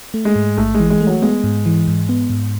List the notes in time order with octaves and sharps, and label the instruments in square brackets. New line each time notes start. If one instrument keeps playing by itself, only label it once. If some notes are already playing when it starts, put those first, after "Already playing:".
[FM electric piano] A3
[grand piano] G#3
[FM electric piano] G#2
[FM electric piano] A1 [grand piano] A3
[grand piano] G#3
[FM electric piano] E3
[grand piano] G#3
[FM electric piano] A3
[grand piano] F#3
[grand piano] G#3 [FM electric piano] B3
[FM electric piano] G#2
E3
G#2
B3
G#2